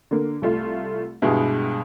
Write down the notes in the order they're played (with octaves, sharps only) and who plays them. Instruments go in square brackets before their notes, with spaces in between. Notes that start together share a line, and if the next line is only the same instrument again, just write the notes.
[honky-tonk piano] D3 A#3
C2 A3 F4
[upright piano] G2 B2 G#3 [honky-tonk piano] E4 F#4 G4